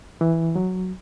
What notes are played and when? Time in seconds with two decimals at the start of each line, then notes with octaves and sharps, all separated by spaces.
0.21 E3
0.56 F#3